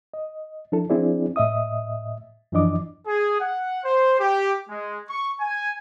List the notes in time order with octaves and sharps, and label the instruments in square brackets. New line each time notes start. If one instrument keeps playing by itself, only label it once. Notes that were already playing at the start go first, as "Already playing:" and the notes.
[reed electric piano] D#5
F3 D4 E4 A4
F3 C4 D4 E4 G#4 D5
A2 D#5 E5 D#6
F#2 E3 F3 D4 D#5 D6
[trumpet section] G#4
F#5
C5
G4
G#3
C#6
G#5